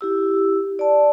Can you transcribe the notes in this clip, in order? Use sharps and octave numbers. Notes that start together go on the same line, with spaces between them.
E4 G4 E6
D5 A5